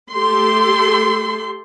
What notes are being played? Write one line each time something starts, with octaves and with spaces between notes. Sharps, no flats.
A3 G4 A4 C6